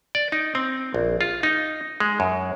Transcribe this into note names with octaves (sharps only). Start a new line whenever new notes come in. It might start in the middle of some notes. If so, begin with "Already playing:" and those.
D5
D#4
C4
A#1
F4
D#4
G#3
F#2